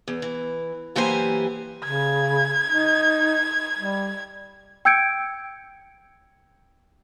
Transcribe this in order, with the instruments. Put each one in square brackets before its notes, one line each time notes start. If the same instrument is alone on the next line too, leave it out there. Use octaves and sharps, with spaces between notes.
[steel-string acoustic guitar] E2
E3
F#2 E3 A#3 G4 C5 G#5
[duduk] C#3 [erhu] G#6
[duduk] D#4
G3
[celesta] G5 E6 G6 G#6 C#7 D7